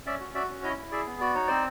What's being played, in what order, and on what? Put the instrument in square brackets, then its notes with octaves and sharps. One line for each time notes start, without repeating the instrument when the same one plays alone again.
[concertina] C#4 D5 E5
F#4
F#4 D5 E5
C#4
E4 C#5 D#5
E4
G#4 D5 E5
B3
F#4 D5
D#4 C#5
C4 C5 D5